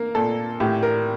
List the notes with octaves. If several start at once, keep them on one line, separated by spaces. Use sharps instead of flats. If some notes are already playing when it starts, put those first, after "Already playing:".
Already playing: A#3 A#4
A#2 A4
A2 G4
A#4